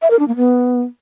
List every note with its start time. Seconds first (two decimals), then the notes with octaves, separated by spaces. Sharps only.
0.02 E5
0.10 A#4
0.19 D4
0.28 A#3
0.36 B3